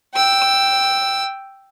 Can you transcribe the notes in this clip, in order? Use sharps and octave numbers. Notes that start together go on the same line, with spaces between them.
G5 E6